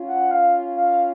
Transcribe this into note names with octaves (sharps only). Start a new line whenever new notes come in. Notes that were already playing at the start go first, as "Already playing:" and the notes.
Already playing: C#4 F4
F#5
F5
F5